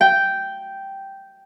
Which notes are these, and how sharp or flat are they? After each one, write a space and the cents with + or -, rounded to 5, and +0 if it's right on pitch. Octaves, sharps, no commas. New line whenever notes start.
G5 -5